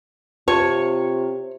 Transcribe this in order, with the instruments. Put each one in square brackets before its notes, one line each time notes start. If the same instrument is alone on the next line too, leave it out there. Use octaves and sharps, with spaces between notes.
[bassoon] C3 [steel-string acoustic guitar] C4 F4 A5 [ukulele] C#5